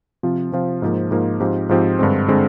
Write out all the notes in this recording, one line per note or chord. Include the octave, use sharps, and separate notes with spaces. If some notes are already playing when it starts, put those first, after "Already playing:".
C3 F3 C4 F4
C3 F3 C4 F4
G#2 F3 A#3
G#2 F3 A#3
G#2 F3 C4 G4
G#2 F3 C4 G4
G2 D3 G#3 C4
D3 G#3 C4